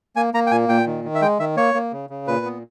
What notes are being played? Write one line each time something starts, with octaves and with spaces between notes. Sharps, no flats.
A#3 G#5
A#3 A#5
G5
A#2 G#5
A#2 G5
D#3
D#3
E5
G#3 G5
D#3 E5
A#3 C#5
A#3
C#3
C#3
A#2 B4
B3